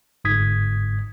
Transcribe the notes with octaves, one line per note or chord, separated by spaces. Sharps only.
G1 G#2 D#6 G#6 B6